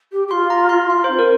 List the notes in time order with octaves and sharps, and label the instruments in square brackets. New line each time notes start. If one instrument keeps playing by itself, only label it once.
[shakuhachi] G4
G4
[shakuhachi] F4 [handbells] C6
[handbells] A#5
C6
[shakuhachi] F4 [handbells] C6
[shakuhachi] C4 [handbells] C5
[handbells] A#4